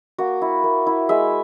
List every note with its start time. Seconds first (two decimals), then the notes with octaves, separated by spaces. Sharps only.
0.18 A#3 F#4
0.42 E4
0.64 A#3
0.87 E4
1.09 G#3 E5